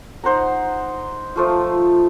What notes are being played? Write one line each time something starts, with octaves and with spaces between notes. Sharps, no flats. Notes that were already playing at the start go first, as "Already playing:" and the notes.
D#4 C5 F#5 A#5
F3 A3 F4